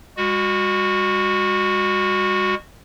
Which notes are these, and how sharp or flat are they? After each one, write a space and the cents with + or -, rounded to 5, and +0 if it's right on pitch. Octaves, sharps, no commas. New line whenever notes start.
G#3 -45 F#4 -10